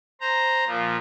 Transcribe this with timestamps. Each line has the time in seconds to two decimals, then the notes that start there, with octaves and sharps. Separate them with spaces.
0.21 C5 A#5
0.67 A#2 F3